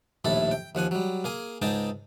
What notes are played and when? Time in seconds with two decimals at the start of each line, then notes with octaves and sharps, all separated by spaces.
0.25 A#1 D#2 A2 E4 A4
0.51 G5
0.75 D#2 F3 F#5 G#5
0.91 F#3 G3
1.24 A#3 G#4 G#5
1.62 C#2 G#2 D#4 G#4 G5 A5